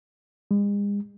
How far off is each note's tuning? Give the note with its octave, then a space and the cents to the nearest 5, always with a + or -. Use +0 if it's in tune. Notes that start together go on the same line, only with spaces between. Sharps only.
G#3 -40